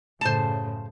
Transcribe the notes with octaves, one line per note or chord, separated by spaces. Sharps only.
F#2 A2 C#3 C5 A5